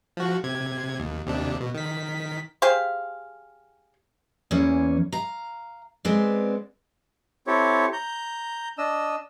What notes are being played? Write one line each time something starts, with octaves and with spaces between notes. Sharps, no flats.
F3 F#4
C3 G#6
D#2
D#2 C3 D4
B2
D#3 B6
G4 G#4 C5 F5
E2 E3 A#3 C#4
F5 A#5
G#3 B3 C4 D5
C4 E4 G4 A4 C#5
A#5 G6
D4 D#5 E6